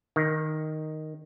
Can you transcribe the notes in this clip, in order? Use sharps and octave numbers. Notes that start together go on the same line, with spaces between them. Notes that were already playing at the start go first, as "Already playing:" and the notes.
D#3